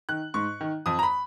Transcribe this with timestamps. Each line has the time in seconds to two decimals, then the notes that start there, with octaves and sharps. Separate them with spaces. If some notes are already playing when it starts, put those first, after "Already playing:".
0.09 D#3 F#6
0.34 G#2 C#6
0.61 D#3
0.86 F2 D#6
0.99 A#5
1.03 B5